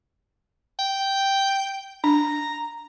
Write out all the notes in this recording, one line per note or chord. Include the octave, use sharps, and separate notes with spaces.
G5
D4 A#5